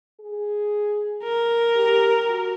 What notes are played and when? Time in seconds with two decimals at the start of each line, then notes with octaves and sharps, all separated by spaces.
0.21 G#4
1.23 A#4
1.76 G4
2.26 F#4